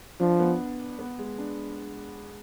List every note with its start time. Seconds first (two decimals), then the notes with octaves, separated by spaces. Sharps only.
0.20 F3 D4
0.40 B3
0.99 B3
1.19 G#3
1.38 D4